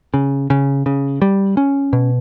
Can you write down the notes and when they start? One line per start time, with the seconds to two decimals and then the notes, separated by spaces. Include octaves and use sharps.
0.14 C#3
0.50 C#3
0.86 C#3
1.22 G3
1.57 C#4
1.93 B2